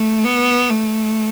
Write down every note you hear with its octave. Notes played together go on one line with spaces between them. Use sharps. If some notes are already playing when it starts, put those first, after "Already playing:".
Already playing: A3
B3
A3